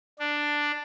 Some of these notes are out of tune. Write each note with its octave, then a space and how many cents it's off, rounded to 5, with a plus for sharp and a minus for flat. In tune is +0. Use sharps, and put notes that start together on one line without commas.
D4 +5